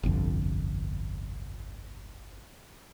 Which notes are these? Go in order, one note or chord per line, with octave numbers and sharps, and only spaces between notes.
G1 C2 F2 D3